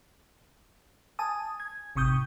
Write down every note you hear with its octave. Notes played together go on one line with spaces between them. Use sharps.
G#5 A5 D#6
G#6
G#1 C3 C#6 D#6 G6